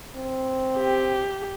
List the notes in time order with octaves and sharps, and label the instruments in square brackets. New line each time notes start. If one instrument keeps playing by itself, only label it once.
[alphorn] C4
[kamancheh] G4